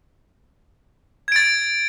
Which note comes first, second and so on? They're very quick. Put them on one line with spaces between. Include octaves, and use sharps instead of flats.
G#6 D7 A6